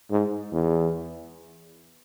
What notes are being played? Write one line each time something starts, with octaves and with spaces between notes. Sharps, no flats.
G#2
E2